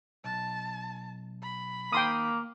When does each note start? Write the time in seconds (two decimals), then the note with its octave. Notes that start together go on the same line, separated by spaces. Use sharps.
0.24 B1 A5
1.43 B5
1.92 D#3 A#3 G5 C6 D#6